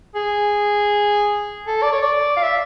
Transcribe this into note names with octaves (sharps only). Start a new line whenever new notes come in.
G#4
A4
D5
C#5
D5
F5
E5